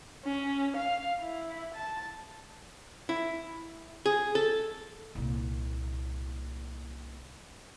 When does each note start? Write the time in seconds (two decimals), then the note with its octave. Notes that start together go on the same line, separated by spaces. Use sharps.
0.25 C#4
0.76 F5
1.20 E4
1.74 A5
3.09 E4
4.06 G#4
4.35 A4
5.15 C2 A#2